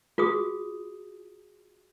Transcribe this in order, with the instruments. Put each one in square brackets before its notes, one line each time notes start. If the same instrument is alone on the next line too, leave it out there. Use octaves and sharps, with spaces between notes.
[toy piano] F4 F#4 G#4 D#6